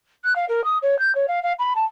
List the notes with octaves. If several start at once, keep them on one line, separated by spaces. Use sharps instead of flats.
F#6
F5
A#4
D#6
C#5
G6
C#5
F5
F5
B5
A5